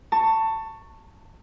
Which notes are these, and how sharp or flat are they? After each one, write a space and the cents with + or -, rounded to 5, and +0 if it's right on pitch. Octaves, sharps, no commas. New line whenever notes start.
A5 +20 C#6 +0